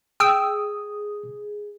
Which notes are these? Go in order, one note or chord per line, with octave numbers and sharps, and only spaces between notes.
G#4 G5 D#6 E6